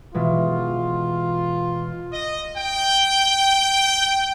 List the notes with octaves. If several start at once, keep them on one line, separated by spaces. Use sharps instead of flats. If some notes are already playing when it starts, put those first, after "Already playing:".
B2 E3 G#3 F4
D#5
G5